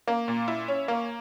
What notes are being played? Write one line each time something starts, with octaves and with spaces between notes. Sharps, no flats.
A#3
A#2
E4
C#4
A#3